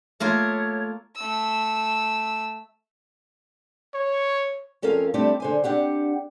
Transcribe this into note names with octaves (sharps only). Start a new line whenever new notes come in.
A3 A#3 F4 C#5
A3 E6
C#5
F2 C#4 A4 A#4 F5
G3 A3 C4 D4 E4 G4
D3 C5 G#5
C4 D4 G4 F#5